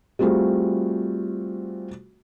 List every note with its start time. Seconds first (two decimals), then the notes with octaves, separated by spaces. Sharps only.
0.19 G3 A3 C4 F4 F#4 G#4